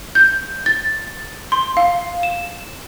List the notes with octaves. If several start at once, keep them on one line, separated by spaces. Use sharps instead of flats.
G6
A6
C6
F5
E7